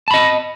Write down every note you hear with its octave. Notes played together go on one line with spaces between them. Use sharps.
D#5 A5 B5